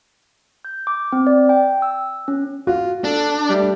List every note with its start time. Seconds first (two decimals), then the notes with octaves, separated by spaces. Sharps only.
0.65 G6
0.87 D6
1.12 C4
1.27 D5
1.49 G5
1.82 E6
2.28 C#4
2.67 F4 F#4
3.04 D4 A4
3.50 G3 A3